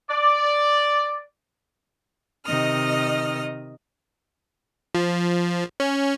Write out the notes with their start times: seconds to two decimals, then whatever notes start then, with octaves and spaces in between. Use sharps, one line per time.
0.10 D5
2.46 C3 D#3 D#5 D#6 F6
4.95 F3
5.80 C#4